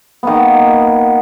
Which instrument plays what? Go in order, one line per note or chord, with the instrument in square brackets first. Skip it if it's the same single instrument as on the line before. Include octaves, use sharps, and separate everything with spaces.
[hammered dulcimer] D#3 A#3 B3